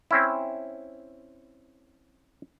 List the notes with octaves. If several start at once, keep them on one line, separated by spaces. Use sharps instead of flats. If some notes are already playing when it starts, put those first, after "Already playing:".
C4 C#4 E4